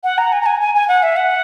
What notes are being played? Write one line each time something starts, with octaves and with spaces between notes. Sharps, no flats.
F#5
A#5
G#5
A#5
G#5
G#5
G#5
F#5
E5
F#5